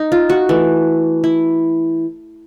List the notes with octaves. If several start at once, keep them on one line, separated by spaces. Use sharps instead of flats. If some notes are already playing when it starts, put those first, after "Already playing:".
Already playing: D#4
F4
F#4
E3 A3
E4